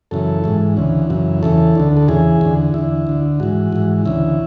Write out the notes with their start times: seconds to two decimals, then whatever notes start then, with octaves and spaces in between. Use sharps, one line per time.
0.11 F#2 C#3 E3 A4
0.44 G#2 E3
0.77 D2 C#3 E3
1.10 F#2 C#3 E3
1.43 E2 C#3 E3 A4
1.75 D2 D3
1.97 A4
2.08 E2 C#3 E3 G#4
2.41 E2 D3
2.74 E2 D3 E4
3.07 D2 D3
3.40 G#2 E3 F#4
3.72 G#2 E3
4.05 D2 C#3 E3 E4